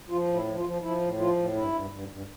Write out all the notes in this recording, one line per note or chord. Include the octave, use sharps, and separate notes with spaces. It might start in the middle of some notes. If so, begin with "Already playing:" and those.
F3 F4
A2
E4
F3
F4
F3
F3 E4
A2
F3 F4
A2
G2 E4
G2
G2
G2